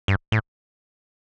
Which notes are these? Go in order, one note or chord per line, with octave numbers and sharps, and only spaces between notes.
G2
A2